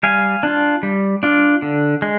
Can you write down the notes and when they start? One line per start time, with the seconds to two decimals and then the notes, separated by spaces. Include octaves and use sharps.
0.03 G3 F5 G#5
0.43 D4 F4
0.83 G3
1.23 D4 F4
1.62 D3
2.02 G#3